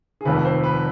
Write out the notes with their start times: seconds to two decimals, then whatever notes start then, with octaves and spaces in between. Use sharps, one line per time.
0.21 G#4
0.25 F1 F2 D#3 B4
0.45 C5
0.64 B4